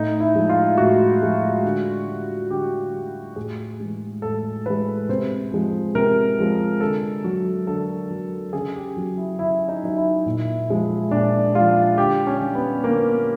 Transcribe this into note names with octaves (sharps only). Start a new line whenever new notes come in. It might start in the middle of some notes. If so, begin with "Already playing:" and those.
Already playing: A2 D#4
E4
F3 G#3
F4
A2 F#4
F3 G#3
D3
G3
D3 G4
G3
A2 G#4
E3 G#3
A2 A4
E3 G#3 B4
C3 C5
F3 G#3
C3 A#4
F3 G#3
D3 A4
F#3
D3 A4
F#3
C#3 G#4
G4
F#3
E4
C#3 E4
D#4
F#3 D#4
E4
A#2
F3 G#3
A#2 D4
F3 G#3 F4
D3 G4
C#4
G3
B3
D3 A#3